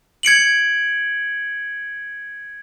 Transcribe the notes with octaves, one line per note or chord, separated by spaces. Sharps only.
G#6 C#7 D7 F#7